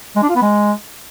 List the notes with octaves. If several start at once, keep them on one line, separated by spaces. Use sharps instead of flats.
G#3
D4
F4
B3
G#3